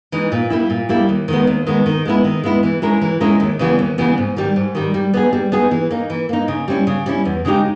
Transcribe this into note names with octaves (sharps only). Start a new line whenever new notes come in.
E3 G#3 D#4
A#2
G3 A#3 E4
A#2
G3 A#3 E4
D#2
D#3 G#3 B3
D#2
D#3 G#3 B3
D#3
G#3 B3 E4
D#3
G#3 B3 E4
E3
G#3 C#4 E4 A#4
E3
G#3 C#4 E4 A#4
D#2
C#3 E3 G3 B3
D#2
C#3 E3 G3 B3
G#2
D#3 G3
G#2
D#3 G3
G3
B3 D#4 G#4
G3
B3 D#4 G#4
E3
A#3 D#4
E3
A#3 D#4
C#3
G3 C#4 E4
C#3
G3 C#4 E4
E2
C#3 G#3 D#4 G4